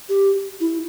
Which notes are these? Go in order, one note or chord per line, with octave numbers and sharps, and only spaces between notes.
G4
E4